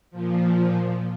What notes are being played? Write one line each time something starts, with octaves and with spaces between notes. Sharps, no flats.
A#2 F3